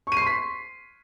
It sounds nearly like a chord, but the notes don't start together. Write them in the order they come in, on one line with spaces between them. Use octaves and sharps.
C#6 D#7 C7 C6 B6